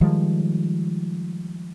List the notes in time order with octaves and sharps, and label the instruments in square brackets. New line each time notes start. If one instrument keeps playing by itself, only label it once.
[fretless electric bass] D#3 F3 G3 G#3